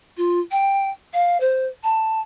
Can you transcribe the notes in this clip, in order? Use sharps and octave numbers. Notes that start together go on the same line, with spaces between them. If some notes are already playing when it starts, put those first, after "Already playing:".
F4
G5
F5
C5
A5